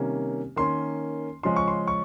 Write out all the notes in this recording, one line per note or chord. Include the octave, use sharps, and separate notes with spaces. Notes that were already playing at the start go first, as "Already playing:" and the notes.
Already playing: C3 D#3 G3 A#3 C#4
D#3 A#3 C#4 C6
C#3 F3 G#3 C#4 C6
C#6
C6
C#6